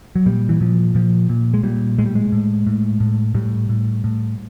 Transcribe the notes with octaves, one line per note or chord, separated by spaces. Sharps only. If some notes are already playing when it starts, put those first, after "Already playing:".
F#3
A#2 G3
E3
A#2 F3
A#2 F3
A#2
G#3
A#2 G3
A2 G#3
G3
G#3
A2
A2
A2
A2 G3
A2
A2